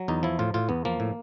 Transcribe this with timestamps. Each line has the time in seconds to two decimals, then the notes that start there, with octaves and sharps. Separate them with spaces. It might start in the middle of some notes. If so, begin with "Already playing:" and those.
Already playing: F#3
0.08 E2 D#4
0.23 F3 E4
0.39 A2 F4
0.54 A2 F4
0.69 E2 B3
0.85 F3 A#3
1.00 A2